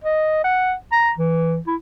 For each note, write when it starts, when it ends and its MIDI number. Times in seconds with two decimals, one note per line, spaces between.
0.04 0.44 75
0.44 0.74 78
0.92 1.11 82
1.18 1.58 52
1.67 1.75 64